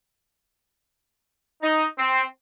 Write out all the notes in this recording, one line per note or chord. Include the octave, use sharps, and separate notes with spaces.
D#4
C4